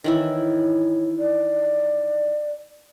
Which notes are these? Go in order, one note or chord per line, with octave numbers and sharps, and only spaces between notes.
D#3 E3 E4 C#5
D5